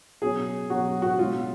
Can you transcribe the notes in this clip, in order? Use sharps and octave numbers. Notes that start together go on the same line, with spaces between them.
B2 F#3 C#4 G#4
B2 F#3 C#4 F#4
F#4
B2 G#3 C#4 F4